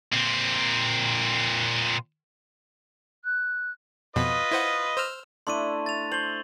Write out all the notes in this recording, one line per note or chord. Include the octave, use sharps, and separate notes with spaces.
A#2 C4
F#6
F2 B2 F4 B4 D#5
E4 C5 F#5
C5 E6 F6
A3 D4 E4 C6 C#6 D#7
A6 F7
C5 F#7 G7